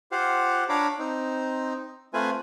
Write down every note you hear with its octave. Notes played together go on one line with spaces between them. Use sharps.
F4 G4 C5 F5 F#5
D4 C#5 F5 A#5 B5 D6
C4 D#4
A3 C4 F4 B4 G#5